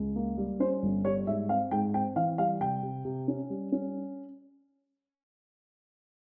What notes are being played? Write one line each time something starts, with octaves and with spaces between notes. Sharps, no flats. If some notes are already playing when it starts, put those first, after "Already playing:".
Already playing: C#2
A#3
G3
C#4 C5
G1
G3 C#5
G#2 E5
C4 F5
G#2 G5
C4 G5
E3 F5
G3 F5
C3 G5
C3
C3
C#4
G3
C#4